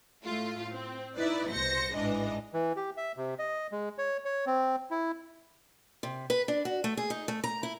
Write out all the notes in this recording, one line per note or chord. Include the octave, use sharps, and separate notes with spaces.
A2 A3 F4
C4
D#4 E4 B4 D5
C2 B2 C5 A#6 C#7
A1 G#2 E3 D4 D#5
E3
G4
E5
C3
D#5
G#3
C#5
C#5
C4
E4
C3
B4
D4
F#4
A3
G#4
D#4
A3
A#5
E4